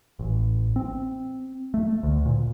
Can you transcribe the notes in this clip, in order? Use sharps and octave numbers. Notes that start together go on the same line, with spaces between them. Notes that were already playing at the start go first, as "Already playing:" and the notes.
A1
C4
A3
D2
A#2